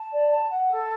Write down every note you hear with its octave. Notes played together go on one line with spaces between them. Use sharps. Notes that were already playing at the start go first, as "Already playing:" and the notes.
Already playing: A5
D5
A5
F#5
A4